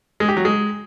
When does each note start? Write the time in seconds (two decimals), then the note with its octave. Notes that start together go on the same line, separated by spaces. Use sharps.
0.20 G#3
0.28 G4
0.37 F#3
0.45 G#3